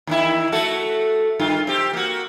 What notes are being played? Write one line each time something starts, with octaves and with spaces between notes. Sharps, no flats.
D#2 D#3 E4
A3 F#4 A4
G2 D#3 F4
C4 G4
A#3 F#4